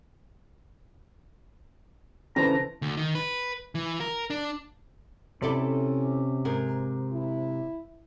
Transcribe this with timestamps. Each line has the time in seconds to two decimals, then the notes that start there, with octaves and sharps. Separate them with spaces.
2.36 C#3 E3 D4 A4 B4 C5 A#5
2.82 D2
2.97 D#3
3.15 B4
3.75 E3
4.00 A#4
4.30 D4
5.42 C3 C#4 E4 A4 D5
6.45 G#2 G#4 A#4
7.13 E4